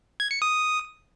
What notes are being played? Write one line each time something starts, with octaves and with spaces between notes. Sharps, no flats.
G#6
C#7
D#6